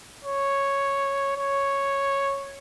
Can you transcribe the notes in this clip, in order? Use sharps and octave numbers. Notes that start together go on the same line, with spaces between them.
C#5
C#5